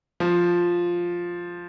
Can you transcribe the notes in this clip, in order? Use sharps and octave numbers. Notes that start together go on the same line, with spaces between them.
F3